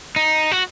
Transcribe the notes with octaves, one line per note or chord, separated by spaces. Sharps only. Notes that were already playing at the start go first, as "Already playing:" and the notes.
D#4
F#4